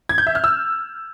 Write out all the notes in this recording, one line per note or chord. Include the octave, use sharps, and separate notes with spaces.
G#6
G6
E5
F6
E6